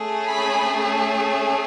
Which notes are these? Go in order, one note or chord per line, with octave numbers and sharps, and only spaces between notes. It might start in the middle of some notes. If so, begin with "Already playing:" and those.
Already playing: A3 C#4 G#4
G#5 B5